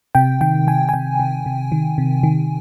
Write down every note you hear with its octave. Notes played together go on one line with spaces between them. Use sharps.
C3 G5
D#3 G5
D#3 G#5
G#5
C3 G5
C3
C3
D#3
C3
D#3